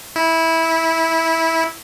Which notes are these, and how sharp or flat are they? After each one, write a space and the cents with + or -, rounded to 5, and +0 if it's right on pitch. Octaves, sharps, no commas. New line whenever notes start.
E4 -15